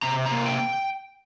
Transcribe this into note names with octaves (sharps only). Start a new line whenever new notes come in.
C3 A#5
A#5
A#3
G5